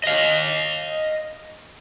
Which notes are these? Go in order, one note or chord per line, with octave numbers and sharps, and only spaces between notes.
D#5 F5